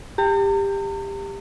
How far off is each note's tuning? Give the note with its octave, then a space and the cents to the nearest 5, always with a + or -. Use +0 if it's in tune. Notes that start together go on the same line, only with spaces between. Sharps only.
G4 +20 A#5 -45